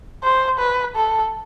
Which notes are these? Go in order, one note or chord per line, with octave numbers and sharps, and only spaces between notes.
C5
B4
A4